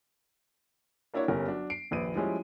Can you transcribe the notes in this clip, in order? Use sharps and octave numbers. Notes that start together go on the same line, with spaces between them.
A#3 D4 E4 F#4 C#5
G1 G3 C#4 A#4
F#3 D4
C7 D7
D#1 A#1 B4 D#7
F3 G3 G#3 C#4 E4